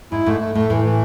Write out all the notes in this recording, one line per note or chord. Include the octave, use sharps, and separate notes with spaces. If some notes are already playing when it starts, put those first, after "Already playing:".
G#2 E4
G#2 A3
A3
A2 A3
A2 E3
E3